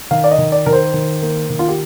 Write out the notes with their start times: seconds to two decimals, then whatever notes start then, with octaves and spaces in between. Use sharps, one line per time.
0.11 D#3 F5
0.24 D5
0.31 D#5
0.38 D#3
0.52 D5
0.66 D#3 A#4
0.73 C5
0.93 D#3
1.22 A#3
1.50 D#3
1.59 F4
1.68 G4